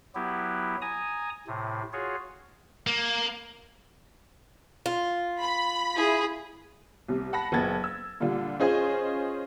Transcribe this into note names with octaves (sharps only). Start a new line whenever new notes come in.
F#3 B3 E4 G4
G#5 A#5 D#6
A2 C3
F4 F#4 G#4 C#5
A#3
F4
B5
E4 G#4
C2 C3
F#5 A5 B5 A#6
F#1 A#2 B3 A5 G#6 A6
E6
A#2 D3 G3 F4
C#4 F4 G#4 C5 D#5 G#5